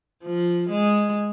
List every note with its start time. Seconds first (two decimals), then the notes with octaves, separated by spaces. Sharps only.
0.24 F3
0.70 G#3